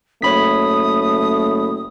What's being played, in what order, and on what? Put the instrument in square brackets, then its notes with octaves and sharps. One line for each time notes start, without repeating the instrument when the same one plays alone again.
[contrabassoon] F#1 [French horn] A3 [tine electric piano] C#5 B5 B6 [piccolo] D#6